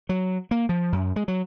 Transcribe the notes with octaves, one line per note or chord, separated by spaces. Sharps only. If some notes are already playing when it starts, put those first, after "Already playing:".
F#3
A#3
F3
F#2
G#3
F#3